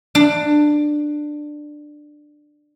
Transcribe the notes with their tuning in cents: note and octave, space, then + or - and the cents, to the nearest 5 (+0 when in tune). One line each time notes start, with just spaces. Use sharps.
D4 +15